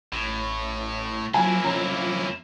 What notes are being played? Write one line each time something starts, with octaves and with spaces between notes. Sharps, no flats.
A1 A2
F3 F#3 A#3 E4 G#5
F2 C#4 A#5